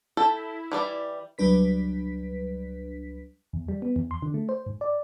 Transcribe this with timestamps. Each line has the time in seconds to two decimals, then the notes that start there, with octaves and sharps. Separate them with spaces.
0.17 E4 A4 G5
0.72 E3 G3 D5
1.38 C#2 F#3 G3 D4 B4 B6
3.53 E2
3.68 G3
3.82 B3
3.96 E2
4.11 C6
4.22 D3
4.34 A3
4.49 C5
4.66 G#2
4.81 D5